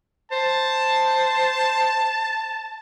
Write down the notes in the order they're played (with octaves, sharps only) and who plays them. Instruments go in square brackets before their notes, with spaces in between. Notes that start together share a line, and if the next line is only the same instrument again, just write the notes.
[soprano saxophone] C5 [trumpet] A5